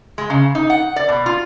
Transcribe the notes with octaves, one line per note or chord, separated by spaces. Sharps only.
G#3
C#3
D#4
F#5
D5
B2
F4